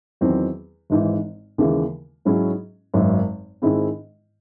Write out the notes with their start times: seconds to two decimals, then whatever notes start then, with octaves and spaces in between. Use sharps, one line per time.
0.21 E2 D#3 F#3 C4
0.90 G#1 G#2 E3
1.58 D#2 C#3 E3 G#3
2.25 G#2 F#3 C#4 E4 G#4
2.94 G#1 F#2 D#3 F#3
3.62 G#2 D#3 G#3 C4 E4